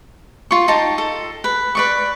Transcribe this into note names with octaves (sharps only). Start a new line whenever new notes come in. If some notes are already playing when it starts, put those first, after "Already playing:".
F4 C#6
D#4 G4 A5
A4
B4
B4 D5 C#6